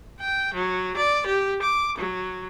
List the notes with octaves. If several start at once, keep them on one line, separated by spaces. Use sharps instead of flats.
G5
F#3
D5
G4
D6
F#3